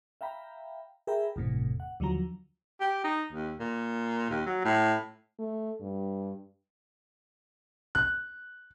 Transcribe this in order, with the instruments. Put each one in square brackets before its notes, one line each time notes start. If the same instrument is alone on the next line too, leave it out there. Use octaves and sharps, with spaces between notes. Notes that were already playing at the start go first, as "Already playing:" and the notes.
[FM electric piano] E5 F5 G5 A#5 B5
G#4 A#4 E5 G5 A#5 B5
G1 E2 A2 C3
F#5
D#2 D3 F3 F#3 A#5
[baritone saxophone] G4
D#4
D#2
A#2
D#2
F#3
A2
[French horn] A3
G2
[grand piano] F#6